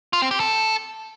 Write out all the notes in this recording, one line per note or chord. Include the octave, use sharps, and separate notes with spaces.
F4
C4
G4
A4